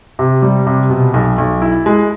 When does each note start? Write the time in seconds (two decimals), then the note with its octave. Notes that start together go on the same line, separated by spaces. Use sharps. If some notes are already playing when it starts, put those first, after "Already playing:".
0.19 C3
0.42 G3
0.67 C3
0.90 B2
1.14 B1
1.38 B1
1.62 E4
1.86 G#3